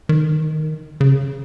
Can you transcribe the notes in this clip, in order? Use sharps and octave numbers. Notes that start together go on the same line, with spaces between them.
D#3
C#3